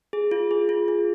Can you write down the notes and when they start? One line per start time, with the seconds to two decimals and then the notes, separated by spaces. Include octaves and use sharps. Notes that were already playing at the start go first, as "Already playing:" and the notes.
0.13 G#4
0.31 F4
0.51 G#4
0.69 F4
0.88 G#4